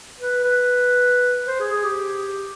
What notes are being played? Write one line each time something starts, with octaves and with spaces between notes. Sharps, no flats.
B4
B4
C5
G#4
G#4
G4